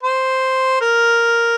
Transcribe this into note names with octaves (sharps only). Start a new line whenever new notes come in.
C5
A#4